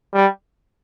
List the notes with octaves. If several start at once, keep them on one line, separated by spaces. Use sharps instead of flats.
G3